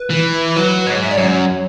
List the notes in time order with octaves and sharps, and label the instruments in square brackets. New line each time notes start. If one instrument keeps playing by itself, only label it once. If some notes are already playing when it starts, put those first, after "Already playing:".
Already playing: [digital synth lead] B4
[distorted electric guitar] E3
[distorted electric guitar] F#3 [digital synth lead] B4
[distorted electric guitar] G#2 [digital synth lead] C#5
[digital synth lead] E5
D5
[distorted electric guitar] F#2 [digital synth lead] C#5